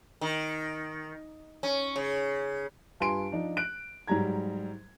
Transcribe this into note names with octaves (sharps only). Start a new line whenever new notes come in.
D#3
C#4
C#3
G2 F4 B4 G#5 C6 D7
F3 D4 D#4
F#6 D7
G#2 F#3 G3 A#5 G#6